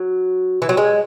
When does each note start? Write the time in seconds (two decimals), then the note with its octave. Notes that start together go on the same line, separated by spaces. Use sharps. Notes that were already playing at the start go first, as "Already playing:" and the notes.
Already playing: F#3
0.62 E3
0.69 F#3
0.77 G#3